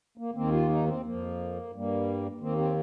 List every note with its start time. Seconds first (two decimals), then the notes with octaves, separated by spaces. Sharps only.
0.18 A#3
0.35 D#2 D#3 A#3 C4
0.52 F4
0.69 D#4
0.86 C4
1.03 F2 F3 A#3
1.72 G2 G3 A#3
2.41 D#2 D#3 A#3 C4
2.58 C4